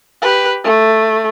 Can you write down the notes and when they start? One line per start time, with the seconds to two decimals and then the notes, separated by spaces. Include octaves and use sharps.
0.22 G4 B4
0.64 A3